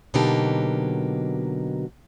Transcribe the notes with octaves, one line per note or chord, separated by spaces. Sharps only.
B2 D3 F#3 A#3 D#4 G4